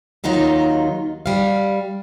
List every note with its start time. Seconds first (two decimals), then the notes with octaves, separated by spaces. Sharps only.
0.24 D#2 D#3 F#3 D#4 F4
1.26 G3 F5